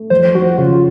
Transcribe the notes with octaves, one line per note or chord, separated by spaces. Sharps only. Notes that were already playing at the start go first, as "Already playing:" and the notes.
Already playing: A3
F2 C5
F3 F#4
C#3 F4